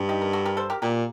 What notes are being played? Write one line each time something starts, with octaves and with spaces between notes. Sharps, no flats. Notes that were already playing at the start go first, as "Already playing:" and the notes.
Already playing: G2
D#4 G4
A#4
F#4 A4
G4 A#4
A4 C5
G4 A#4
A#2 G4 A#4